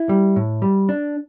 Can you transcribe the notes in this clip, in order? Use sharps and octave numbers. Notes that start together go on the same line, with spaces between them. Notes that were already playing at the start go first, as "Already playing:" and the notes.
Already playing: E4
G3
A2
G3
D4